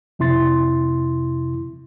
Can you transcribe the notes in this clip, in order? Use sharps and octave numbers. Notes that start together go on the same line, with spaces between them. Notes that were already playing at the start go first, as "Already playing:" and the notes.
F2 C3 E4 C6 A6